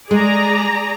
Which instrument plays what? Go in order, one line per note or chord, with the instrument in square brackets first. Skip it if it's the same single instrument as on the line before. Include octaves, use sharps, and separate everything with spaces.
[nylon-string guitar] G#3 [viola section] G#4 D5 A#5